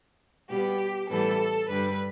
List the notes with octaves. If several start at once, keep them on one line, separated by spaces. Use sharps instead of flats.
B2 G3 B3 G4
A2 E3 G3 B3 A4
G2 D3 G3 B4